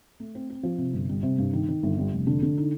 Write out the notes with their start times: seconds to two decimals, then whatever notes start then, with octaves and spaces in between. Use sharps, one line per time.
0.20 A3
0.35 C4
0.50 C4
0.63 F3
0.78 C3
0.93 G1
1.09 G3
1.23 C3
1.38 G2
1.53 D#3
1.68 D#3
1.83 G1
1.98 G3
2.13 F1
2.27 D3
2.42 D3
2.58 D#4